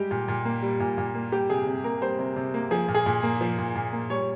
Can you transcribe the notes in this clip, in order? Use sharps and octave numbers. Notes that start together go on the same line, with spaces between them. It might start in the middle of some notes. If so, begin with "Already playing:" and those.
Already playing: G3 G#3 G4
A#2
A#2
A#3
G3
A#2
A#2
A#3
G3 G4
C3 G#4
C3
A#3 A#4
G3 C5
C3
C3
A#3
F3 G#4
A#2
G#4
A#2
A#3
F3
A#2
A#2
A#3
G3 C#5